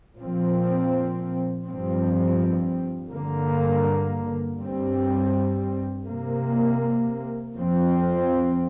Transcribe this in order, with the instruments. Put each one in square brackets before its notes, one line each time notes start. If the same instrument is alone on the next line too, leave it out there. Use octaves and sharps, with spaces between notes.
[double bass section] A#2 F3 C4
G2 F3 C4
G2 D3 A#3
G2 G3 C4
C3 A#3
F2 F3 C4